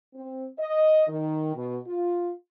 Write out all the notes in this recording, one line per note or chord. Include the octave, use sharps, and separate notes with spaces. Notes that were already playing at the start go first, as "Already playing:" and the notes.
C4
D#5
D#3
B2
F4